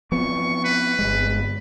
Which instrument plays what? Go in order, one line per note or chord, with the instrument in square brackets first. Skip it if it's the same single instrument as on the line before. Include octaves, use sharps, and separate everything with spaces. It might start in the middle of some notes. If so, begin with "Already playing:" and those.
[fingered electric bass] F3 B3 C4 [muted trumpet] C#6
[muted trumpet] B4
[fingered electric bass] G1 G#3